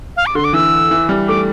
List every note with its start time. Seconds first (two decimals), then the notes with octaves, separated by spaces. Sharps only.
0.17 F5
0.26 D6
0.35 D3 C6
0.44 D6
0.53 E3 E6
0.91 E3
1.09 G3
1.28 A3 D6